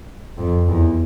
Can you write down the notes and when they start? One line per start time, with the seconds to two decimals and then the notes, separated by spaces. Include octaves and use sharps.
0.38 F2
0.68 E2